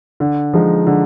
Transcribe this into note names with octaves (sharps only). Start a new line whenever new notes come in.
D3
F3 G#3 D#4
D3